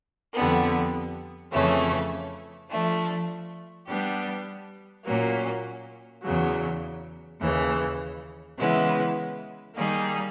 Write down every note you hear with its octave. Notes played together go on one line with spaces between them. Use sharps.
F2 D3 G3 B3
F2 C#3 E3 A3 C#4
F3 A3 D4
G3 B3 D4 G4
A#2 F#3 A#3 C#4
E2 C#3 F#3
D#2 C#3 E3
C#3 E3 G#3 B3 E4
D#3 G3 A#3 D#4 G#4